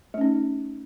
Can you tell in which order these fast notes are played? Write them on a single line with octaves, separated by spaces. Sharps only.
A3 C#4 D#4